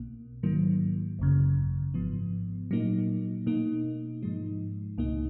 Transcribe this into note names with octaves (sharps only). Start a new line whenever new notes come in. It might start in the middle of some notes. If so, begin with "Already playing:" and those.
Already playing: B1 B2 A#3
G#2 D#3 F#3 A#3
G#1 F#2 C#3
G#2 F3 B3
A#2 F#3 A#3 D#4
B2 A#3 D#4
G#2 F3 G#3 D#4
C#2 B2 A#3 D#4